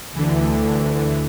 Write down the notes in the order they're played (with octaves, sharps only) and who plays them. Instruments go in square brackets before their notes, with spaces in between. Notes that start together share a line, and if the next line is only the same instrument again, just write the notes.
[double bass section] D2 [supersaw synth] D3 E3